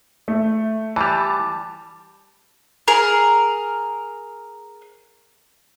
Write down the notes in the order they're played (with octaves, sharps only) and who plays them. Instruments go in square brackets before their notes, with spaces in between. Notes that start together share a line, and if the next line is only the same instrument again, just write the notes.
[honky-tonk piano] A3
[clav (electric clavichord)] E3 G3 [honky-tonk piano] A5
[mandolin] G#4 A#4